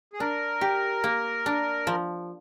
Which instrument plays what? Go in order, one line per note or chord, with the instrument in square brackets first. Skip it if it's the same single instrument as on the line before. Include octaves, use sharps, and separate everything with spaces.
[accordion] G#4
[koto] D4 [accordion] A#4
[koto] G4
A#3
D4
F3